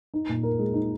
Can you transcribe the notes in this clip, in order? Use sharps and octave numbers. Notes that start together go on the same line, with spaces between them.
D#4
A#2
A#4
G#3
D#4